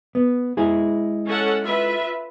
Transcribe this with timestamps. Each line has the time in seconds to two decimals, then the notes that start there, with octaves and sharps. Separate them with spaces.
0.15 B3
0.57 G#3 E4 G#4
1.26 C#4 A4 F#5
1.61 F4 B4 E5